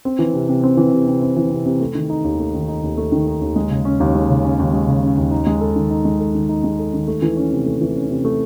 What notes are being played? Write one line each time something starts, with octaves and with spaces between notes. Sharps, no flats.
C4
E3
C3
C3
C4
E3
C3
C3
C4
E3
C3
C3
A3
D#3
D#4
D#2
A3
D#3
D#4
D#2
A3
D#3
D#4
D#2
G#3
C#3
C#4
D#2
G#3
C#3
C#4
D#2
G#3
C#3
C#4
D#2
D#4
G#3
A4
D#3
D#4
G#3
A4
D#3
D#4
G#3
A4
D#3
A3
E3
C#4
C3
A3
E3
C#4
C3
A3